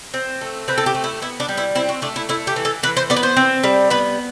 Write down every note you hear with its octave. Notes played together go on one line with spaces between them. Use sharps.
C4
A3
C4 B4
A4
G4
A3
E4
B3 E4
D4
G3
E4
C4 E4
F#4
A3 D4
E4
A3 E4
G4
E3
A4
E3 B4
C5
B3 D5
B4
C5
C4
G3
B3 B4